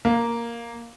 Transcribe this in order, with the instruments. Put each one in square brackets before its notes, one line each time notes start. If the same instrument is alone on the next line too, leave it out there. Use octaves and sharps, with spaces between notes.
[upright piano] A#3